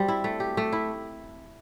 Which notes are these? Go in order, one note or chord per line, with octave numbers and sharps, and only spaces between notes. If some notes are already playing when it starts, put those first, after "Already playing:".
Already playing: G3 C4
E4
A3
G4
A3
E4